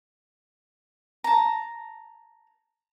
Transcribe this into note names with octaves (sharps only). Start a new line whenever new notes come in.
A5 A#5